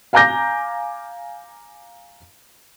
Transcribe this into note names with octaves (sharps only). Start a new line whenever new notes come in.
F5 G#5 A#5 D6 G6 A#6